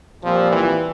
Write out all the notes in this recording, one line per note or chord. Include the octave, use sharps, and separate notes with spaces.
A#2 F3 G3 C4
E3